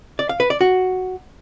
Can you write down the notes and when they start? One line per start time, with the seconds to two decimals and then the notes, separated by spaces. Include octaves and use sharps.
0.19 D5
0.29 F5
0.40 B4
0.50 D5
0.61 F#4